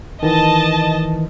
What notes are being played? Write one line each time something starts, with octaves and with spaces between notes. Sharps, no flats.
D#3 E3 D#5 A5